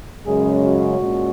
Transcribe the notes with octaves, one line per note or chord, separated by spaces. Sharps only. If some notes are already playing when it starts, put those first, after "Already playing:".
F#2 C#3 G#3 C#4 G#4
F#4
A#2 G#3 C#4